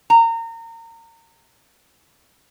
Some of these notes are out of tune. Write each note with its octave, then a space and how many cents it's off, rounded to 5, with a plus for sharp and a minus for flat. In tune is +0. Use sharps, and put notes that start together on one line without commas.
A#5 -30